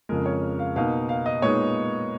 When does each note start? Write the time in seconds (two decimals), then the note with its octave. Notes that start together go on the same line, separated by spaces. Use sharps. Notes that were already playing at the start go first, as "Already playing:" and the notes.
0.09 F2 C#3 F3 G#3 A#4
0.26 C#5
0.59 F5
0.76 B2 A#3 D#4 F5
1.09 F5
1.26 D#5
1.42 A#2 G#3 B3 D#4 C#5